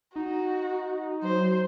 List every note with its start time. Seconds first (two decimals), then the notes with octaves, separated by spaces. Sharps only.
0.16 D#4 F#4
1.23 F#3 C5